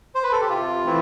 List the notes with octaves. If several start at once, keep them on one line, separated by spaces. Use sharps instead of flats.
C5
B4
A4
G4
C3 F4
E3 A3 C4 E4